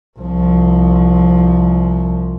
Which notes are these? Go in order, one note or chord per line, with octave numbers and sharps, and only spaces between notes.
C2 F3